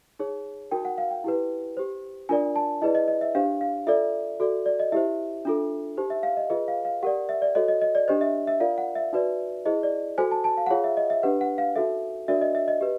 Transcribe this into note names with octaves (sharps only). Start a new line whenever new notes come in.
D#4 G#4 C#5
D#4 F#4 A#4 G5
F#5
F5
G5
E4 G4 B4
G4 C5
D4 F4 A#4 D5 G#5
A5
E4 G#4 B4 D5 D#5
D#5
D#5
E5
D4 G4 C5 F5
F5
F4 A4 D5 E5
F#4 A4 D5
D5
D#5
E4 G4 C5 E5
D4 F4 A4
D#4 G4 C5
E5
F5
D#5
F4 G#4 B4 D#5
F5
F5
G4 A#4 D5 F#5
E5
D5
F#4 A4 C#5 D#5
D#5
D#5
D5
D4 G4 C5 D#5
E5
E5
F4 A#4 D5 F5
F#5
E5
D#4 F#4 B4 D5
E4 G#4 C5 D#5
D5
F#4 A4 C5 G#5
A5
A5
F5
F#5
F4 G#4 C#5 F5
E5
D#5
E5
D4 G4 B4 F#5
F#5
F5
D#4 F#4 A4 E5
D4 F#4 A#4 D5 E5
D#5
E5
D#5
G4 B4